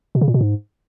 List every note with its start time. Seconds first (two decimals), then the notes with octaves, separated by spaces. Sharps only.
0.15 B2
0.21 C#3
0.28 A#2
0.34 B2
0.41 G#2